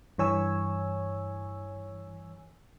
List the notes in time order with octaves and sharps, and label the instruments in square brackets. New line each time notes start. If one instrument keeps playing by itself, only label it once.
[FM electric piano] G2 E3 C#5 G#5 E6